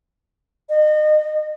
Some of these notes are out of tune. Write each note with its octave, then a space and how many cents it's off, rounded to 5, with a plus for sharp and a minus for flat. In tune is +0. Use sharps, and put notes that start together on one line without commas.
D#5 -35